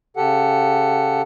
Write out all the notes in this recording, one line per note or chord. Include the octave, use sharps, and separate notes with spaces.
C#3 G4 A4 F#5